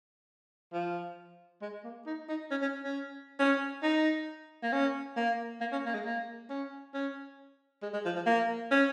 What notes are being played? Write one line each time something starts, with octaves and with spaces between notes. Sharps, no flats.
F3
G#3
A#3
D#4
D#4
C#4
C#4
C#4
C#4
D#4
A#3
C#4
A#3
A#3
C#4
A#3
G#3
A#3
C#4
C#4
G#3
G#3
F3
F3
A#3
C#4